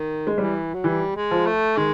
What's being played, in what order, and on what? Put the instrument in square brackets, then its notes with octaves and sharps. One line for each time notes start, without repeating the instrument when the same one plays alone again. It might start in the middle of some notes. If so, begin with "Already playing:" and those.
Already playing: [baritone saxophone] D#3
[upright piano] G#3
[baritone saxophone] E3 [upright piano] G3
[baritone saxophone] F#3
[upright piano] E3 [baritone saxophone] G3
[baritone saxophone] G#3
[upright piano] F3
[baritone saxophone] A3
[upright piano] D#3 [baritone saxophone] G#3